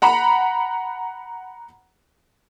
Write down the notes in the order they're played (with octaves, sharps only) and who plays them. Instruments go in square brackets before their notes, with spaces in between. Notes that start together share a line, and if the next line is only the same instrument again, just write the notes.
[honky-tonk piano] F#5 A#5 B5